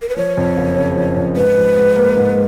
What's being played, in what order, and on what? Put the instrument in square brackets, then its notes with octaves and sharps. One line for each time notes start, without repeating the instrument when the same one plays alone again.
[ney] A#4
B4
[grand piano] F3 [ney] C#5
[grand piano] F2
F#1
C#3
F3
F2
[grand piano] G#2 [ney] B4
[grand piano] F3
G#2
A#3
G#2